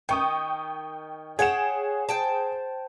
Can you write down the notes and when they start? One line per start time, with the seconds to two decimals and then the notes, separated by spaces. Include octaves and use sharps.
0.09 D#3 G5 C#6 D#6
1.39 G#4 C#5 F#5 G5 E7
2.09 C5 G5 A5